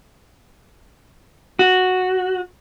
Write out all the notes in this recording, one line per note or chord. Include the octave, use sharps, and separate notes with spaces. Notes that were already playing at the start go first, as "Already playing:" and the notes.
F#4